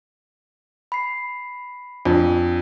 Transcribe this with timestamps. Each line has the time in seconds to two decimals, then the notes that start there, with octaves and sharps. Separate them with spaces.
0.92 B5 C7
2.05 F2 D4